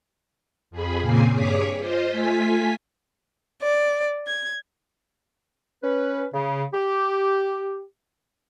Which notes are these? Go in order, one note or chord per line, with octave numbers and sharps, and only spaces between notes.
F2 G#4 B5
A#2 C#3 A#3 C4 G#5 C7
G2 G#4 C#5 D6 B6
F4 C5 D#5
A3 F4 G#5 B6
D5
G#6
C#4 B4
C#3
G4